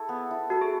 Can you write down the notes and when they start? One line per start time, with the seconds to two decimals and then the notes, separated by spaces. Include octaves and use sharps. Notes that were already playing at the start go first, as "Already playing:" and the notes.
Already playing: E4 G#4 A4
0.09 B3
0.31 E4
0.50 F#4 A4
0.62 G#4